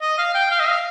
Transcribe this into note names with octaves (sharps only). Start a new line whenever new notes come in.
D#5
F5
G5
F5
D#5
F5